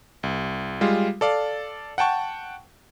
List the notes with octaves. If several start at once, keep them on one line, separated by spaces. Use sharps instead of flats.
C2
G3 G#3 F4
A4 D5 F5
F#5 G5 A5 C#6